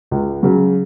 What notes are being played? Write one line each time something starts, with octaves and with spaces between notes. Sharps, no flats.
C#2
C#3 F#3